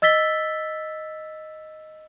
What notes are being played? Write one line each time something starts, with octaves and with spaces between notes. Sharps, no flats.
D#5 E6 A6 B6 G7